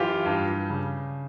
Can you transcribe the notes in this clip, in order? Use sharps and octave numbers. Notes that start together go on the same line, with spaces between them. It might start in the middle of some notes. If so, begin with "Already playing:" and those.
Already playing: F#2 E3 F4 G4
G2
C#3